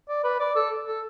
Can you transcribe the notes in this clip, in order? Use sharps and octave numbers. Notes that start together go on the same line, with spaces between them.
D5
B4
D5
A4
A4